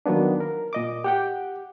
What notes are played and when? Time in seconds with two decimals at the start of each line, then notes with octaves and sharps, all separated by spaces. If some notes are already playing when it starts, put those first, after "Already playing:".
0.06 D#3 F#3 A#3 B3 D4
0.40 A#4
0.73 A#2 D#5 D6
1.04 G4 F#5 G5